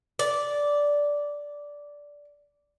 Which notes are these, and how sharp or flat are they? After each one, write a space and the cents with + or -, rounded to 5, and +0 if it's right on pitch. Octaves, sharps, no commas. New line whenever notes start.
D5 -10